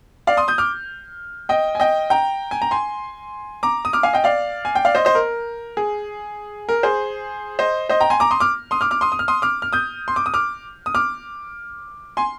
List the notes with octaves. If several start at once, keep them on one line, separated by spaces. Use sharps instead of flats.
D5 F5
C6 D#6
D#6 G6
D6 F6
D#5 G5
G#5
D#5 G5
G5 A#5
G#5
A#5
G#5 C6
A#5 D6
D#6
D6 F6
F5 G#5
D#5 G5
D5 F5
G#5
G5
D5 F5
C5 D#5
C5 D#5
A#4
G#4
A#4
G#4 C5
C5 D#5
C5 D#5
G5 A#5
G#5 C6
A#5 D6
C6 D#6
D6 F6
C6 D#6
D6 F6
D6 F6
C6 D#6
D#6
F6
C6 D#6
D6 F6
F6
D#6 G6
C6
D6
D#6
D6 F6
D#6
D6 F6
G#5 C6